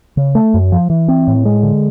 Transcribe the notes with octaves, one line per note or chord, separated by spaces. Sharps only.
C#3
A3
F#2
F3
E3
C4
A2
G#3
D3